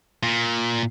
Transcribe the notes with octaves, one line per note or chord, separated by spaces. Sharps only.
A#2